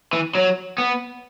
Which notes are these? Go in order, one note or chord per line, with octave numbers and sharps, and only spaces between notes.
E3
F#3
B3